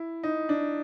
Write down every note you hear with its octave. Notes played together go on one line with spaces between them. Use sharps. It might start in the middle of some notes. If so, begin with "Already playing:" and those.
Already playing: E4
D#4
D4